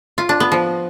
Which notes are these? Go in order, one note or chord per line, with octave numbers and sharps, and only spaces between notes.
F4
D4
B3
F3